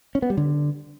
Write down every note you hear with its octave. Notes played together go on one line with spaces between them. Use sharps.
C#4
B3
G3
D3